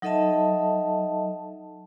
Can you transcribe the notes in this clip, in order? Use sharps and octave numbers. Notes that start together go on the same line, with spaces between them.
F#3 D#4 A4 D#5 E5 A5